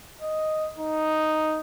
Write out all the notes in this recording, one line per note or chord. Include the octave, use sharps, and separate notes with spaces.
D#5
D#4